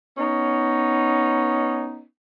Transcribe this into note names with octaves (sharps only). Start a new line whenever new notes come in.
B3 C#4 D#4